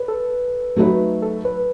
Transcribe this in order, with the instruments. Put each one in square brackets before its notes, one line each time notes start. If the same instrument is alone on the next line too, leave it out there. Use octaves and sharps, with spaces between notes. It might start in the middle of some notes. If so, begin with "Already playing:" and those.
Already playing: [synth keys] B4
A4
[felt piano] F#3 A3 D#4 F#4 B4
[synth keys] A4
B4